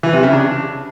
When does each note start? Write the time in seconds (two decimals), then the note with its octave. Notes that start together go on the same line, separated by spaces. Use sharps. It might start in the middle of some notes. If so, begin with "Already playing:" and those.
0.03 E3
0.13 C3
0.23 C#3
0.33 D4